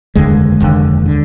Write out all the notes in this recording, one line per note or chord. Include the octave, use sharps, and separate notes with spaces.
F1 D#2 D3 G#3
F1 D#2 D3
D3